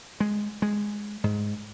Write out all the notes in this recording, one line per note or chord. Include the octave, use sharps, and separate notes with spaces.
G#3
G#3
G#2